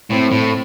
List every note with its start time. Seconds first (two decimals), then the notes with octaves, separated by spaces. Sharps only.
0.12 A2 C4
0.32 A2